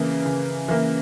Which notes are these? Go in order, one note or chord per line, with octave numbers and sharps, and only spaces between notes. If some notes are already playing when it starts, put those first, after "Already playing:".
Already playing: C#3 E3 A#3
C#3
E3 A#3